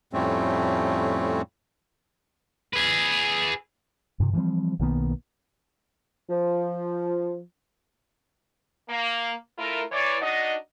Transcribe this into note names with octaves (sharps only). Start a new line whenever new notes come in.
F2 A2 G3 A3 C4 C#4
G#4 B4
G2 C3
E3 F3 G3 C4
B1 D#3 A#3 B3
F3
A#3
A3 E4 F4 A#4
E3 C#5 D5
D4 D#4 F#4 D#5